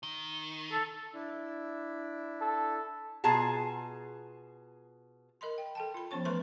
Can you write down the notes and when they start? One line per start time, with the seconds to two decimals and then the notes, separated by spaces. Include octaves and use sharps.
0.03 D#3
0.72 A4
1.14 D4 E4
2.41 A4
3.24 B2 F4 G#4 A5 A#5
5.41 A#4 D#5 B5 C6
5.58 G5
5.75 A4 G5 A5
5.94 F4 B5
6.11 F3 B3 C#4 C#5 C#6
6.25 E3 A3 B4 C5 C6 C#6